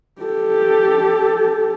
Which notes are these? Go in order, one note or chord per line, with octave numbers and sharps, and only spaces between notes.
G4 A4